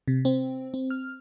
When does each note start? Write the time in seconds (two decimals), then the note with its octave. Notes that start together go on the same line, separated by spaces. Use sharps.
0.08 C3
0.25 C4
0.74 C4
0.90 F6